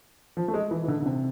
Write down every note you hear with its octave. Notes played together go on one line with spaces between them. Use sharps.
F3
A3
G#3
E3
E3
D3
D3
C3